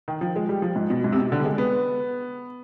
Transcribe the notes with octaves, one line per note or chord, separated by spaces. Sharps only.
D#3
F3
G#3
G3
F3
G#2
B2
G#2
C3
B2
D3
G3
G#3
B3